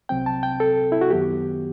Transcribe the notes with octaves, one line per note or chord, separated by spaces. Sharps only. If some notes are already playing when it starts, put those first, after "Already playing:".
C2 C3 F#3 C4 G5
A5
G5
A4
E4
F#4
F#2 D#3 F#3 B3 G4